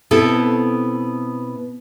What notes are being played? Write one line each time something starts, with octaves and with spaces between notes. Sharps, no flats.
B2 B3 C4 E4 A4